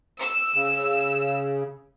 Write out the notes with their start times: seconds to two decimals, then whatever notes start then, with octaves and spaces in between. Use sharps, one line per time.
0.20 E6
0.54 C#3